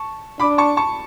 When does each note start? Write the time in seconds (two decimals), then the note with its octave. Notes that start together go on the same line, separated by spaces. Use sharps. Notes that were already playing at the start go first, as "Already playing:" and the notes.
Already playing: A5 C#6
0.39 D4 B5 D6
0.58 A5 C#6
0.77 A5 C#6